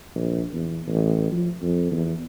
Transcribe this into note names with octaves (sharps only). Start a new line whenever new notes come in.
A#1
E2
A1
F3
F2
E2